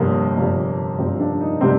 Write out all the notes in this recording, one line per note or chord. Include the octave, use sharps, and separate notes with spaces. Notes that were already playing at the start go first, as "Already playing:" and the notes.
Already playing: G1 F2 C3 G3 A#3
G1 F2 C3 G3
G1 F2 C3 G3 C4
D4
D#4
C3 G3 C4